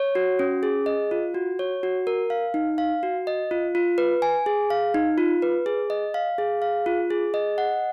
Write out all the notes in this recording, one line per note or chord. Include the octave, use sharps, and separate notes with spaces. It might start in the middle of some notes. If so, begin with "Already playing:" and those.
Already playing: C#5
F#4
C#4
G#4
D#5
F4
F#4
C#5
F#4
A#4
F5
D#4
F5
F#4
D#5
F4
F4
B4
G#5
G#4
F5
D#4
F4
B4
G#4
D#5
F5
G#4
F5
F4
G#4
D#5
F#5